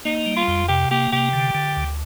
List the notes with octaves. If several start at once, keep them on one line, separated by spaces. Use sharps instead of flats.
A#3 D#4
G3
F4
F2
C3 G4
A#3 G4
C3 G4
D3
D3
D2